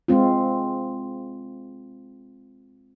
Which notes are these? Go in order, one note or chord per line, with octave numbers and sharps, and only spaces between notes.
G#3 C4 F4